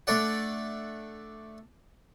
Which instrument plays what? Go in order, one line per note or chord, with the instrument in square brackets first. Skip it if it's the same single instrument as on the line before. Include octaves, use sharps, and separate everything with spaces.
[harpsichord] A3 D4 D5 F#5